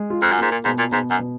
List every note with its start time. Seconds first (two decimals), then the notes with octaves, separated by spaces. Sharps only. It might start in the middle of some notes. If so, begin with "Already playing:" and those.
Already playing: G#3
0.10 F4
0.22 F2
0.32 F#2
0.38 G#2 A#3
0.52 A#2
0.65 G#2 B2
0.78 A#2
0.92 G#2 B2
1.10 F#2
1.19 B2